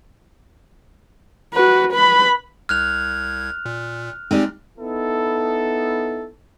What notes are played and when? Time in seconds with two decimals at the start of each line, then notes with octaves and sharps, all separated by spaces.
1.54 F#4 B4
1.92 B4 B5
2.69 C2 F6 F#6 G#6 F7
3.65 A#2
4.31 G#3 C4 D#4 G4 D5
4.78 B3 D#4 E4 A4